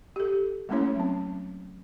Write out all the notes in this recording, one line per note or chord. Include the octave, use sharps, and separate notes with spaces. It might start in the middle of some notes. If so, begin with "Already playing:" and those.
G4 A4
G3 A3 A#3 C#4 E4 C#5
F#3 C4